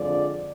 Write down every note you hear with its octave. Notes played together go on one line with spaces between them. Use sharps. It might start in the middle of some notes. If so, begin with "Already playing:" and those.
Already playing: F2 D3 F3 G#3 D5